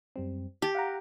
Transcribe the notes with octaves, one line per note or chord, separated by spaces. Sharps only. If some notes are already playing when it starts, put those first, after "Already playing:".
F#2 G3 C4
G4 A5
F5 F#5 A#5